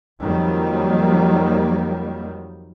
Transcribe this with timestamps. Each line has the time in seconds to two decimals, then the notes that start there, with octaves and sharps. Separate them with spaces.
0.21 F2 D#3 F#3 G3 A#3